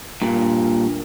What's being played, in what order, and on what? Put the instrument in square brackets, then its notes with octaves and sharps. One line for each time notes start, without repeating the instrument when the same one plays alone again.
[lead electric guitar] G2 A#2